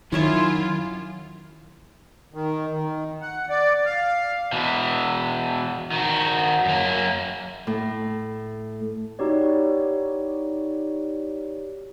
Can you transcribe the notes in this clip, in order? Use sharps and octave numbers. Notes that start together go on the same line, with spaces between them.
F#2 D#3 E4 F4 C#5 E5
D#3
D#3
F#5
D5
F5
B2 E3
D#3 F#4
F#2 A#3
A2
D#4 E4 F#4 G4 C#5 D5